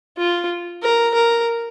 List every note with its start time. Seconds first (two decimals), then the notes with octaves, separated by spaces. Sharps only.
0.17 F4
0.83 A#4
1.14 A#4